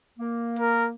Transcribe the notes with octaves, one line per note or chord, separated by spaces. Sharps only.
A#3
A#4